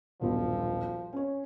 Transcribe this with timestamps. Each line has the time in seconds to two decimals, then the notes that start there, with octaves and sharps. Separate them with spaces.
0.21 D#1 B1 G2 F3
1.13 C#4 C#5